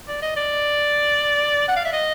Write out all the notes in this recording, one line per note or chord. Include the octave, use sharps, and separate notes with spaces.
D5
D#5
D5
F#5
F5
E5
D#5